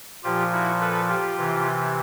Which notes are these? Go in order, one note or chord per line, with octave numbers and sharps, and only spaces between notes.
A#2 F3 F4 G4
E4 F#4
A4 B4
F4 G4
C3 E3